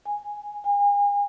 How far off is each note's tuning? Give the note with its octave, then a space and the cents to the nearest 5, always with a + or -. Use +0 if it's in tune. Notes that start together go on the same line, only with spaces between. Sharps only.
G#5 -10
G#5 -40